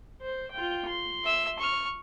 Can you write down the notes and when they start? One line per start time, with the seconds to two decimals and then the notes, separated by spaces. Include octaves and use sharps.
0.22 C5
0.51 F4 G5
0.88 C6
1.24 E5 E6
1.58 C#6 F6